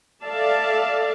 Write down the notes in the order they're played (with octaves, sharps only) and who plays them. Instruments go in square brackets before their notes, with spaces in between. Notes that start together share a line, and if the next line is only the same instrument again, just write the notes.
[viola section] A4 D5 E5 F5 A5